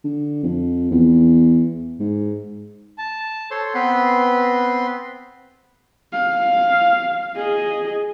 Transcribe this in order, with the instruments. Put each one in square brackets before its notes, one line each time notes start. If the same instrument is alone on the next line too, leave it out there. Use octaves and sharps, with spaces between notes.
[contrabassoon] D3
F2
E2
G#2
[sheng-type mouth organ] A5
A4 C5 C#5 C6
B3 C4 B4 C6
[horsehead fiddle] F5
G#4 D#5